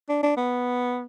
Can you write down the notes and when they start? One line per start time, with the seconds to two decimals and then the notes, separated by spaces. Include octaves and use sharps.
0.09 D4
0.23 D4
0.37 B3